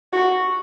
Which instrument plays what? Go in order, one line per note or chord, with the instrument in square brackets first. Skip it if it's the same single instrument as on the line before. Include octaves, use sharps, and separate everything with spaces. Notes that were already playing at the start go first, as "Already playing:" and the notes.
[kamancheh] F#4